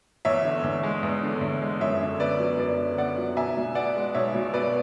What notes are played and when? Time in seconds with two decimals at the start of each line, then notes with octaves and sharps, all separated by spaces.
0.25 E2 C#5 E5
0.45 D3
0.64 E2
0.83 G#3
1.03 E2
1.23 D3
1.41 E2
1.62 G#3
1.80 F#2 C#5 E5
2.01 D3
2.20 B3 B4 D5
2.40 F#3
2.59 F#2 B4 D5
2.79 D3
2.98 B3 D5 F#5
3.18 F#3
3.36 B1 E5 G#5
3.57 B2
3.75 B3 D5 F#5
3.95 G#3
4.14 B1 C#5 E5
4.34 B2
4.53 B3 B4 D5